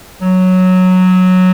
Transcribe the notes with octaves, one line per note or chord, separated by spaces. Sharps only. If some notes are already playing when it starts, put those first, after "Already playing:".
F#3